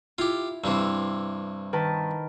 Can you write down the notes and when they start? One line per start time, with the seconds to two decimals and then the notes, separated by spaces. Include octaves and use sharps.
0.18 E4 F4 G4
0.64 G2 C3 E3 C5 E6
1.73 D#3 B4 A5